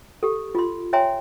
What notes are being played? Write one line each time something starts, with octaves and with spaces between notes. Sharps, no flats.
G4 A4
F4 C6
C#5 E5 G5 G#5 A#5 C6